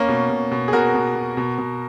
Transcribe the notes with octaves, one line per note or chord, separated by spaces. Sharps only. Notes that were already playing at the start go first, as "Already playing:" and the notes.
Already playing: A#3 C#4
B2
B2
B2
G#4
B2 F#4 A#4
B2
B2
B2
B2